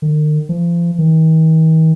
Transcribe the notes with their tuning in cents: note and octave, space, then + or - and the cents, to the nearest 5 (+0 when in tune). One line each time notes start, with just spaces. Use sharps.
D#3 -40
F3 -35
D#3 +45